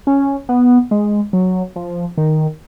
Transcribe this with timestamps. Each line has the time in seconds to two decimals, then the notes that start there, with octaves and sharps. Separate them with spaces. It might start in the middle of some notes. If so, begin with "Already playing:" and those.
0.07 C#4
0.49 B3
0.91 G#3
1.33 F#3
1.76 F3
2.18 D#3